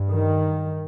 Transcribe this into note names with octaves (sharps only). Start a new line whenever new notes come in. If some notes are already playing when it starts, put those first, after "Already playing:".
Already playing: G2
D#3